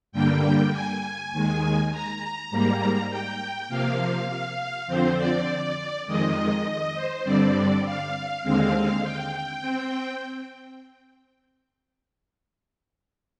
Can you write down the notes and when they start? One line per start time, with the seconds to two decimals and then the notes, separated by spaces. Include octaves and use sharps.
0.12 G2 D3 G3 A#3 G5
0.72 G#5
1.32 D#2 D#3 G#3
1.91 A#5
2.51 G#2 G3 A#3
3.10 G5
3.69 C3 F3 A#3 F5
4.28 F5
4.87 F2 D3 F3 C4 C5
5.17 D5
6.06 F2 D#3 G#3 D#5
6.65 D#5
6.95 C5
7.24 G2 D3 G3 C4 D5
7.84 F5
8.43 D#2 D3 G#3 C4 F5
9.03 G5
9.62 C4